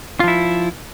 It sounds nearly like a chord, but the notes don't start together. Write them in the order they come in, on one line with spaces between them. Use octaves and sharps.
F4 F3 E4